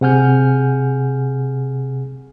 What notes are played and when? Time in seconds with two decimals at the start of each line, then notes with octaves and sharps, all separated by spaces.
0.01 C3 G#4 F#5 G#5 F6 G6